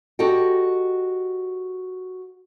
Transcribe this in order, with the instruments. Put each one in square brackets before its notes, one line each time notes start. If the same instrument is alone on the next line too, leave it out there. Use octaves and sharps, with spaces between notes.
[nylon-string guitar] F#4 G4 A4 D#5 G5